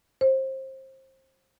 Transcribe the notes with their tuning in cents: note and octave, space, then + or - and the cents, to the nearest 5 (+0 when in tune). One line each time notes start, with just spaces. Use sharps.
C5 +25